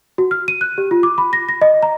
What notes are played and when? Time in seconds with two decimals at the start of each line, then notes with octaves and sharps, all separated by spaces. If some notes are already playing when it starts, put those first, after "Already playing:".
0.18 F#4
0.31 F6
0.48 D#7
0.61 F#6
0.78 G4
0.91 F4
1.03 D6
1.18 B5
1.33 A#6
1.49 A#6
1.62 D#5
1.83 A#5